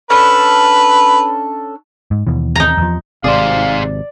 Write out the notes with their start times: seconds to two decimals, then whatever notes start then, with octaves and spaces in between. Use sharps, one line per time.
0.10 C#4 D4 A4 B4
2.11 G#2
2.27 D#2 B2 E3
2.55 D#4 A#5
2.78 E2 F3
3.24 G#1 C3 G#4 C5 D5 F5